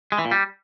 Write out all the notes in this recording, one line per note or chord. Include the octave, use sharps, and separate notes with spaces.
G#3
E3
A#2
G3